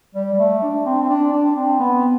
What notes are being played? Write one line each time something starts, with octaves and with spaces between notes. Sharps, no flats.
G3
G3
A3
D4
C4
C4
D4
D4
C4
B3